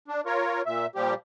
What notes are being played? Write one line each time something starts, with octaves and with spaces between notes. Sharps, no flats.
D4
F4 A#4 C#5
A#2 E5
A#2 F3 G3 G4